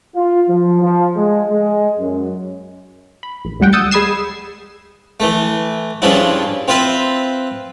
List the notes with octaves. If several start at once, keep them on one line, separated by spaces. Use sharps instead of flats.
F4
F3
F3
G#3
G#3
F#2
B5
A#1
D2 A2 G3 F#5 G5
D#6 E6 G6 A6 C#7
G#3 B5 D#6 G#6 C7 E7
E3 A3
G2 C#3 F3 D4 E4
C4 F4 B4 E5